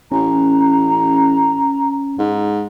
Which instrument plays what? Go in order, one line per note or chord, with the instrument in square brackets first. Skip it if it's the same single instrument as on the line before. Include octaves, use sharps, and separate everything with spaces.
[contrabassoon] A1 [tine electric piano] C#4 [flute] A#5
[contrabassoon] G#2